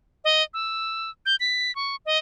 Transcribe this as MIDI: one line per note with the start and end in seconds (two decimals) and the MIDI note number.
0.24 0.43 75
0.54 1.10 88
1.26 1.36 91
1.40 1.74 95
1.75 1.96 85
2.06 2.18 75